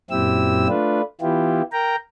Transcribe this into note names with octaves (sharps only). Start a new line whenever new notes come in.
F#2 A#2 C4 E4 G4 E6
A3 D4 F4 B4
E3 B3 E4 F4 G4
A#4 G5 A#5